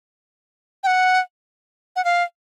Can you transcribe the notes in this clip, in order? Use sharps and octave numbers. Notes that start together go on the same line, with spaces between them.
G5
F#5
F#5
F5